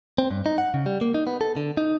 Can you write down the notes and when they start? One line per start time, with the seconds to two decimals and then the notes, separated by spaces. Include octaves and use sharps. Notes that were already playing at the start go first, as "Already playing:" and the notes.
0.18 C4
0.31 G2
0.46 D#4
0.58 F#5
0.74 C#3
0.86 G3
1.01 A#3
1.14 D#4
1.27 B3
1.41 A4
1.57 D3
1.77 D#4